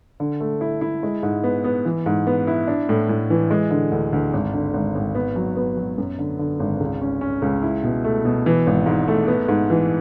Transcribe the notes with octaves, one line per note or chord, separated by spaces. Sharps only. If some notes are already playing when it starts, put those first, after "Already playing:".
D3
A3
E4
E4
G#3
G#2
B3
B3
E3
G#2
B3
E4
D4
A2
A2
E3
G#3
D3
D2
D2
G#1
D3
G#1
G#1
B3
F#3
B3
F#3
F#2
D3
D3
G#1
C#2
C#4
C#4
C#2
E4
B2
A3
B2
E3
G#1
G#2
A3
B3
G#2
E3